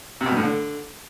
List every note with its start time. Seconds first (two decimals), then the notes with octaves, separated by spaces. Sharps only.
0.21 C3
0.26 B2
0.32 G2
0.37 A2
0.43 D3